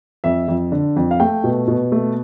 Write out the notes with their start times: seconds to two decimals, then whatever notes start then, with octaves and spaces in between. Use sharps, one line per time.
0.24 F2 E5
0.48 F2
0.72 D3
0.96 F2
1.11 F5
1.20 A3 G5
1.44 B2
1.68 B2
1.92 A3